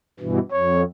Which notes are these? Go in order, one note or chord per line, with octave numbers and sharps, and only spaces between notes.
G2 B2 E3
F2 C#5